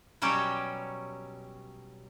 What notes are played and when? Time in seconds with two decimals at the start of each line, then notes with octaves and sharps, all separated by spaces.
0.22 B2 F#3 G3 C#4 G4